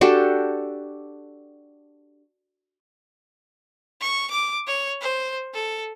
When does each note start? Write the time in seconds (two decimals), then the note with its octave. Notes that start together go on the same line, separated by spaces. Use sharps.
0.01 D4 F#4 G4 A4
4.01 C#6
4.31 D6
4.67 C#5
5.01 C5
5.54 A4